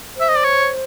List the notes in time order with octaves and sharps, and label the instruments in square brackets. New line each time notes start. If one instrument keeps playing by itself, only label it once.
[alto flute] C5 [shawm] E5
[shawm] D#5
D5
C#5